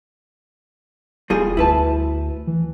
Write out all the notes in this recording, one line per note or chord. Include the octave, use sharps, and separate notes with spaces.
E1 G3 F4 G#4
D2 E4 B4 A5
E3